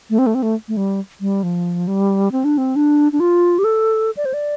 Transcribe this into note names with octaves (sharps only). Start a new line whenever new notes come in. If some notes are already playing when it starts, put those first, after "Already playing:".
A3
C4
A3
C4
A3
A3
G3
G3
F3
G3
C4
D4
C4
D4
D4
F4
G4
A4
D5
C5
D5